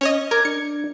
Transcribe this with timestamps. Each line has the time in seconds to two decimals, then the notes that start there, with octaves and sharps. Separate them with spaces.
0.01 C#4 C#5 D#5
0.31 A#4 D6 G#6
0.45 D4 C#7